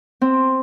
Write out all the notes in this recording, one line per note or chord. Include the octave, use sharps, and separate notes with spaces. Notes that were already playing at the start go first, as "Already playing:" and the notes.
C4